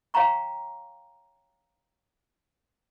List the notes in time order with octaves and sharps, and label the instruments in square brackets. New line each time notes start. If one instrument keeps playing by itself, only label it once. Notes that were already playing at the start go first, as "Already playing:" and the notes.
[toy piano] C#5 F5 G5 A5 A#5 C#6